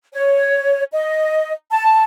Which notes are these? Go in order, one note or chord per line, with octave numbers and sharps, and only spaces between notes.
C#5
D#5
A5